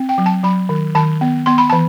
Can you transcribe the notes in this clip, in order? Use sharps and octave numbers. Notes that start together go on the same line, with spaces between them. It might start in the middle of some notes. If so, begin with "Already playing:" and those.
Already playing: C4
G5
F#3
A5
F#3 B5
D#3
D#3 A5
B3
B3 C6
B5
E3 A5